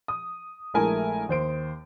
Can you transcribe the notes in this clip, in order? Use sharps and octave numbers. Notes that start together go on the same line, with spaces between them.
D#6
A#1 G#3 A3 E4 A#4 G#5
D#2 C5 D7